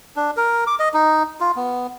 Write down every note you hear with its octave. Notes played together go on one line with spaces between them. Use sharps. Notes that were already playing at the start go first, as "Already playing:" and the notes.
D4
A#4
D6
D#5
D#4
F4
B3